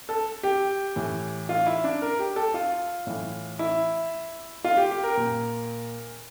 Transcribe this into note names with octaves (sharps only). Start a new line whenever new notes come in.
A4
G4
A2 E3
F4
E4
D4
A#4
G4
A4
F4
A2 E3
E4
F4
G4
G4
A#4
A#2